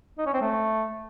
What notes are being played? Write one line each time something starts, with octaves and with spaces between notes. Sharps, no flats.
D#4
C#4
C4
A3